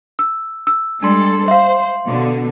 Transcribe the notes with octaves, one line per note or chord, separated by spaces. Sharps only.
E6
E6
G3 G#3 D4 A4 C6
C5 E5 F5 C6
B2 D3